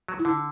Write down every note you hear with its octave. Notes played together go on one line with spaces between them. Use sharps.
F#3
E4
D3